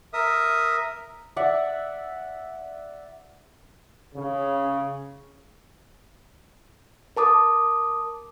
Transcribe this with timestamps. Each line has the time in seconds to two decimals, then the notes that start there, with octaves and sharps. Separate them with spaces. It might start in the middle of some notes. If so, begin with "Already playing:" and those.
0.13 A#4 E5 D#6
1.36 D5 E5 F#5
4.14 C#3
7.17 A#4 A5 D6 D#6